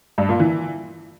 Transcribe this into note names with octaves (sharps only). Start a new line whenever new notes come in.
G2
A#2
E3